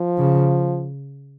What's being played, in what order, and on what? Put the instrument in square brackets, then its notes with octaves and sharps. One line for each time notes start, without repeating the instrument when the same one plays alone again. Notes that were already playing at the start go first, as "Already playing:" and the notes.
Already playing: [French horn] F3
[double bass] C#3